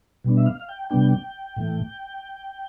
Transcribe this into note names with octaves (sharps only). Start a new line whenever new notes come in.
B2 G3 B3 D4
E5
F5
F5
G5
C3 G3 B3 D4 G5
A2 E3 A3